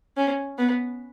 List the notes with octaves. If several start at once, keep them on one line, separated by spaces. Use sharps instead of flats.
C#4
B3